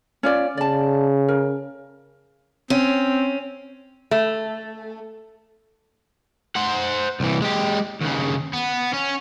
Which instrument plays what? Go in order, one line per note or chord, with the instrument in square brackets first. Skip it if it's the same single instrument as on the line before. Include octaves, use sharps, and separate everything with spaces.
[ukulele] C#4 F4 D5
[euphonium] C#3 [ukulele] D5 A5
[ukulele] A#4
[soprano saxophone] C4 [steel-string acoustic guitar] C#4
[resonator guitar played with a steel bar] A3
[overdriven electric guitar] C5 F#5
C2 E3
G#3 G4
D#2 C#3
B3
C#4